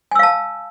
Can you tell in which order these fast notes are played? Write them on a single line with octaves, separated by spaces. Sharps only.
G#5 E6 F5 A5